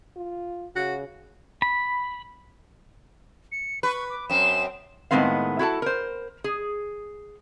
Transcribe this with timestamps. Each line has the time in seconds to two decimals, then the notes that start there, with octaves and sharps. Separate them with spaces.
0.16 F4
0.76 C#3 F#4
1.62 B5
3.52 C#7
3.83 B4 C#6
4.10 D6
4.30 F#2 C4 E7
5.11 A2 D#3 G#3 B3 C4 F5
5.59 E4 F#4 A4 A5
5.82 A#4 C5
6.44 G#4